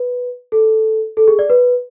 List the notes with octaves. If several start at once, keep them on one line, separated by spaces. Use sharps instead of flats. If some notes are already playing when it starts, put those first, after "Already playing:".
Already playing: B4
A4
A4
G#4
D5
B4